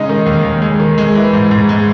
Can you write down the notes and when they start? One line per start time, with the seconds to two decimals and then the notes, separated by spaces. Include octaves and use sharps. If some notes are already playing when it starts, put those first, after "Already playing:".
Already playing: C#3 G#3 D#4 D#5
0.09 D#3
0.26 D#2
0.44 D#2
0.62 G#3
0.80 D#3
0.98 G#3
1.15 E3
1.33 G#2
1.51 G#2
1.69 G#3